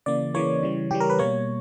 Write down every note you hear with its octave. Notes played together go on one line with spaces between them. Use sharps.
C#3 E3 A#3 D5
C#3 E3 A#3 C#5
C#3 E3 G3
C#3 E3 G3 G4
A#4
B4
B2 G3 A#3 C#5